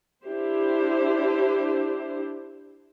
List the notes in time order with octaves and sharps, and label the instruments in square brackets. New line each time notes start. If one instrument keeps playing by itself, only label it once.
[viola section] D4 E4 G4 C5